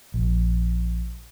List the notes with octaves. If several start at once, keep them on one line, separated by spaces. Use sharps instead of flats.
A#1